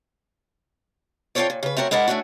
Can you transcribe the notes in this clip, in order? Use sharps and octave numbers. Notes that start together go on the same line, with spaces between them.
C4 F4 G4 A4 C#5 D5
A#2
C#3 B4
A3 C4 F#4 A#4 C#5
G#3 E4 A#4 D5 F#5
A3 A#3 C#4 D4 F#4